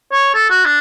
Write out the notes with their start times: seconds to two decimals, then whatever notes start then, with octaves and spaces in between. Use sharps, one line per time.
0.12 C#5
0.34 A4
0.50 F#4
0.65 D4